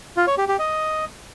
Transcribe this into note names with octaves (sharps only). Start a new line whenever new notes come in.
F4
C#5
G4
G4
D#5